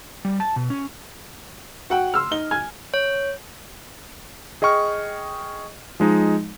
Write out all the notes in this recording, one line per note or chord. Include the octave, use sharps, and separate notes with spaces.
G3
A5
B2
C#4
F#4 F#5 G5
C6 E6 F6
D#4 D#5 G7
G#5 F6 G#6
C#5
G#4 D#5 G5 C#6 F6
F3 G#3 D#4